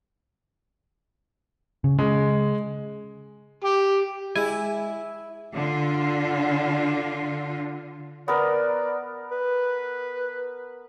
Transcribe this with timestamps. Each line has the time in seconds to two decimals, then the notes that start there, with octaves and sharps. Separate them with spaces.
1.84 C#3
1.99 C#3 G#3
3.64 G4
4.35 G#3 E4 G#5
5.53 D3 F4
8.28 B3 A#4 D5
9.31 B4